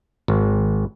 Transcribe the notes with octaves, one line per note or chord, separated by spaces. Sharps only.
G#1